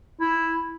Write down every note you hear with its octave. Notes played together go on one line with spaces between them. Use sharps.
E4